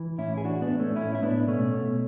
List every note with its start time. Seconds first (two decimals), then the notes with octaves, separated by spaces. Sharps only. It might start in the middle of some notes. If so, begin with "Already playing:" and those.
Already playing: E3
0.18 A2 C#4 E4
0.37 G#4
0.44 E3 D4 F#4
0.62 B3 D4
0.71 A2
0.79 A3 C#4
0.96 A2 C#4 E4
1.15 E4
1.22 A2 B3 D4
1.48 B2 A3 C#4
1.74 B2